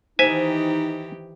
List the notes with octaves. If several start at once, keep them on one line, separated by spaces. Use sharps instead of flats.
D#3 E3 D#4 G4 C5 E5 G#5